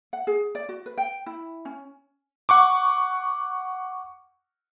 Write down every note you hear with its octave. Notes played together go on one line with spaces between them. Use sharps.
F#5
G#4
D5
F#4
B4
G5
E4
C#4
F#5 C#6 D6